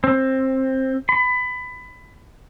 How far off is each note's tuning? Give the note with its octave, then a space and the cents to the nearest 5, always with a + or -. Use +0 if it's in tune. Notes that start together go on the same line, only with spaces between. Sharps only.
C4 +15
B5 +20